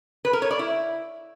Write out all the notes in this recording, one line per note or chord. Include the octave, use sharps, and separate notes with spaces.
B4
A#4
C#5
D5
E4